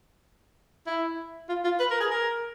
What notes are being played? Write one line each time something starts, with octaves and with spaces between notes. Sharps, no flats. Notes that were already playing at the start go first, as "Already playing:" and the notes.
E4
F4
F4
B4
A#4
G#4
A#4